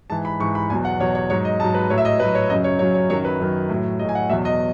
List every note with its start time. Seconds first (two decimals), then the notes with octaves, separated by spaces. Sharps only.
0.10 G#2 E3 A5
0.25 B5
0.40 G#2 E3 C#6
0.55 B5
0.69 E2 B2 F#3 G#5
0.85 F#5
0.99 E2 B2 F#3 C#5
1.15 C#5
1.30 G#2 F#3 C#5
1.45 D#5
1.60 G#2 F#3 A5
1.74 B4
1.90 A2 F#3 C#5
1.98 E5
2.05 D#5
2.20 A2 F#3 B4
2.35 C#5
2.50 F#2 C#3 F#3 D#5
2.64 C#5
2.79 F#2 C#3 F#3 C#5
2.94 C#5
3.10 F#2 D#3 F#3 C#5
3.25 B4
3.40 F#2 D#3 F#3
3.69 A2 F#3
3.99 F#3 D#5
4.05 A2 G#5
4.15 F#5
4.30 E2 B2 F#3 E5
4.45 D#5